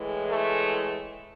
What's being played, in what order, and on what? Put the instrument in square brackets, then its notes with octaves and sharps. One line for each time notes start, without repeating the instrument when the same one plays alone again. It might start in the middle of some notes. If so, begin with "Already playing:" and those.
Already playing: [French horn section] A2 E3 G#3
A3